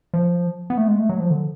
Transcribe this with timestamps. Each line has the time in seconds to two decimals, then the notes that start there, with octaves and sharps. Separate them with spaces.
0.14 F3
0.70 B3
0.78 A3
0.88 G#3
0.99 A3
1.09 F#3
1.20 F3
1.30 D3